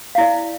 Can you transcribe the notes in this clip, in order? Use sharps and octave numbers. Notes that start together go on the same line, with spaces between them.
E4 D5 F5